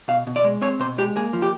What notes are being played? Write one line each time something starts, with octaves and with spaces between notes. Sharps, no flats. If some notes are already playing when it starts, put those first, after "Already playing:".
B2 F5
B2
D5
G#3
C4 C#5
B2 C5
G#3 G4
A#3 G#4
F3
G4